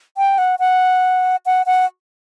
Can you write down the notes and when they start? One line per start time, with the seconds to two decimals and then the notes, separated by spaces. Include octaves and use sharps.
0.17 G5
0.38 F#5
0.59 F#5
1.46 F#5
1.66 F#5